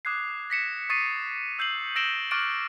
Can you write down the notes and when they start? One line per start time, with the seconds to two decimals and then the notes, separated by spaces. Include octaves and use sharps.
0.05 D6 D#6 F#6 G#6 C7
0.50 A#6 B6 C#7 E7
0.90 C#6 D#6 A6 B6 C7 D#7
1.59 E6 G6 C7 F#7
1.96 E6 A#6 D7 E7 F#7 G7
2.31 C#6 D6 F6 F#6 A6 D7